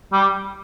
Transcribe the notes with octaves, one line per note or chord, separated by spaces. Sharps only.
G3